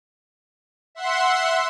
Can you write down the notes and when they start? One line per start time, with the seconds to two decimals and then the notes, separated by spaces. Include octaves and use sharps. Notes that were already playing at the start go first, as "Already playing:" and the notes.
0.95 E5 F#5 C6